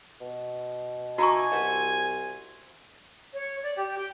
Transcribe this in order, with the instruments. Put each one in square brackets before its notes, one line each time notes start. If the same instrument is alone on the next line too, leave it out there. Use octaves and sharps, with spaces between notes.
[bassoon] B2
[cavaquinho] D#4 E5 D6 [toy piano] F#4 A5 C#6 [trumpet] G#5
[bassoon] C2 [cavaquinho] F#4 C5 E5 [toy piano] D#5
[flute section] C#5
D5
G4
G5